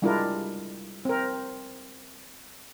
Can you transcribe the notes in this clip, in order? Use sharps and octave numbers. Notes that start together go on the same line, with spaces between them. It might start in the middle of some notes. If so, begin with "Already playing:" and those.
G3 G#3 D4 E4 F4 A#4
C4 A#4